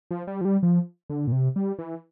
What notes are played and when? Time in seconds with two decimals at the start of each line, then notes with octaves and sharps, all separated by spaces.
0.11 F3
0.27 G3
0.41 F3
0.45 G3
0.63 F3
1.10 D3
1.27 A#2
1.32 C3
1.56 G3
1.79 E3